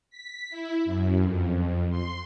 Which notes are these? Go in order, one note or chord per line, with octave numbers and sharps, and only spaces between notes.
B6
E4
F#2
F2
F2
C6